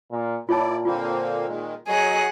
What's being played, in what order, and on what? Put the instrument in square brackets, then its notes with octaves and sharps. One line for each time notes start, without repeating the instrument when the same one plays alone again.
[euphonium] A#2
[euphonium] A#2 [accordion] E4 D5 [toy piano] F4 C#5 A5
[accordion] D3 A#3 C4 [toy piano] F4
[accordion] D#3 G#3
[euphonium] F#3 [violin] G#4 F#5 [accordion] C#5 D#5